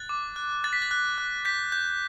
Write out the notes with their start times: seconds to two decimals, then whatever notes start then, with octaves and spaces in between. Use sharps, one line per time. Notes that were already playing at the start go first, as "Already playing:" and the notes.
Already playing: F#6 A6
0.09 D6
0.36 F#6
0.64 F#6 A6
0.73 B6
0.82 A6
0.91 F#6
1.18 F#6
1.45 G6 B6
1.72 G6